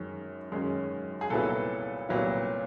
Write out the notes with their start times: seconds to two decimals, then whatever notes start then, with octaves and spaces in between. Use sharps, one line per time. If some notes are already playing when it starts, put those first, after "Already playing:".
Already playing: F#2 D#3 G#3 C#4
0.52 F#2 D#3 G#3 C#4
1.21 G#4
1.30 C2 A#2 F#3 B3 E4 A4
2.09 C2 A#2 F#3 B3 E4